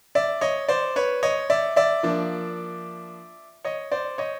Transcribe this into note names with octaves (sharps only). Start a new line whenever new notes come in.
D5 E5
C#5 D#5
C5 D5
B4 C#5
C#5 D#5
D5 E5
D5 E5
F3 A#3 D4
C#5 D#5
C5 D5
C#5 D#5